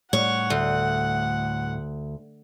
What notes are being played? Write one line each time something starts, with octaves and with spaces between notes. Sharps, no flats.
A2 G3 C#5 F#5
D2